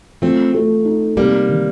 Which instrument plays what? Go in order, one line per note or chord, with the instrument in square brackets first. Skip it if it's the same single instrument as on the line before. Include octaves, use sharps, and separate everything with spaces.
[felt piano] F3 [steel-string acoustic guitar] A3 C4
[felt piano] A3
D#4
[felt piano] C3 [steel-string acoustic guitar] G3 A#3
[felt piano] D#3